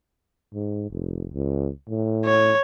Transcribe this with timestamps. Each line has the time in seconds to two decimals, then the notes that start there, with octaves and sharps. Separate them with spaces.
0.54 G#2
0.91 F1
1.33 C#2
1.89 A2
2.26 C#5